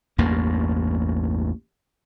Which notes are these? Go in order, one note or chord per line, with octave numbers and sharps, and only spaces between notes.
A1 E2 G2 A#3